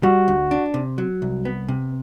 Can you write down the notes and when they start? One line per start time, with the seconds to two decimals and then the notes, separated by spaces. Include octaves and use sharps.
0.03 G3 F#4
0.28 D2
0.51 D4
0.74 C3
0.98 F#3
1.22 C2
1.45 B3
1.68 C3